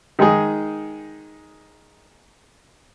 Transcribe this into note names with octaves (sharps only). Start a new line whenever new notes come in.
D#3 G#3 D#4 G#4